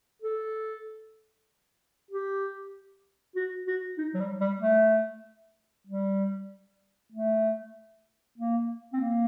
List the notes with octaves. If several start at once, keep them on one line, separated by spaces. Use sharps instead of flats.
A4
G4
F#4
F#4
D#4
F#3
G3
G3
A3
G3
A3
A#3
C4
A#3